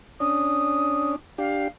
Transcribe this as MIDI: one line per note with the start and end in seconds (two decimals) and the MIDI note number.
0.20 1.16 61
0.20 1.16 62
0.20 1.12 87
1.38 1.68 62
1.38 1.68 67
1.38 1.66 77